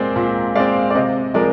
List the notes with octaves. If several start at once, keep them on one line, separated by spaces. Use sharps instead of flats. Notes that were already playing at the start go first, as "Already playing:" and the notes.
Already playing: A#2 G#3 C4 A#4 C5 D5
A#2
G#3 C4 D5 F5
D5
C3 C5 D#5
F3 G#3 A#4 D5